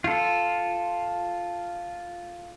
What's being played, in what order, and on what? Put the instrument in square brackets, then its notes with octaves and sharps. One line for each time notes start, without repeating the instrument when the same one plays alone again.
[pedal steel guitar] F4 A4